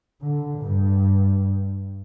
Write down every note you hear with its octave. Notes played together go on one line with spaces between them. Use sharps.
D3
G2